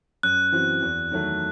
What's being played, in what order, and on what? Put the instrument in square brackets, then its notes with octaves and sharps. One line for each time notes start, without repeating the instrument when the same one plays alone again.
[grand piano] F#2 [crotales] F#6
[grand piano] E3 C4 F#4
E2
D#3 F#3 A3